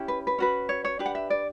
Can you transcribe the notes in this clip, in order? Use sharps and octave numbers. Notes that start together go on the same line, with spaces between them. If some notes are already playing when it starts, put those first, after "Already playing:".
Already playing: C#4 E4 G4
B4
B4
C#4 F#4 B4
C#5
C#5
D4 G4 B4
F#5
E5
D5